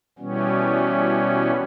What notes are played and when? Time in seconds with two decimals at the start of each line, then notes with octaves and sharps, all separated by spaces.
0.19 B2 E3 G3 B3 C#4